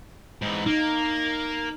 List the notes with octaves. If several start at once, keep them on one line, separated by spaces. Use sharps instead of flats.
G#2 E3
A#3 D#4